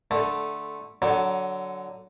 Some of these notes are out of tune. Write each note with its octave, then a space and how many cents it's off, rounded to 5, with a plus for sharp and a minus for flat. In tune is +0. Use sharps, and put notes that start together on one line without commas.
D3 +0 A3 -10
D3 +0 F#3 +15